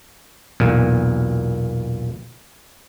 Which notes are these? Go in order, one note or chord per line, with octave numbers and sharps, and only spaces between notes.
B1 E2 A#2